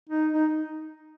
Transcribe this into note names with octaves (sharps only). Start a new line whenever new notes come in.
D#4
D#4